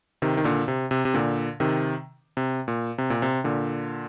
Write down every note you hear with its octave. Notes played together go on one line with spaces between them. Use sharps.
C3 D#3
D#3
A#2 D3
C3
C3
C3
A#2 D3
C3 D#3
C3
A#2
C3
A#2
C3
A#2 D3